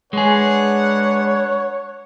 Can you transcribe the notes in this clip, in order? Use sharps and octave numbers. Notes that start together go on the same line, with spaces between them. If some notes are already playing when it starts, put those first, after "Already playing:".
G#3 D4 G#4 B4 C#5 F#5